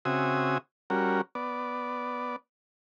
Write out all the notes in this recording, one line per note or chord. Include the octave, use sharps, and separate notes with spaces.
C#3 C4 F#4 E5 G#5 D#6
G3 C#4 F#4 A#4
B3 D5